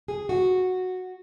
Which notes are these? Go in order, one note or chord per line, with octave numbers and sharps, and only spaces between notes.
G#4
F#4